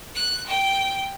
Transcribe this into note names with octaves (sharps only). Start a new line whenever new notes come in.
F#6
G5